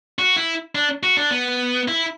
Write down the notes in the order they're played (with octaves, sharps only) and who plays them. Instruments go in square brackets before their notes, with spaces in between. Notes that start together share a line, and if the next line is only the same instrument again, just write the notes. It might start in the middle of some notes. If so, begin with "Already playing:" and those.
[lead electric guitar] F#4
E4
D4
F#4
D4
B3
E4